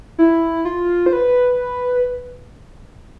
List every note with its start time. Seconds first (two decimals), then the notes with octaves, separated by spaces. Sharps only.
0.18 E4
0.65 F4
1.06 C5
1.13 B4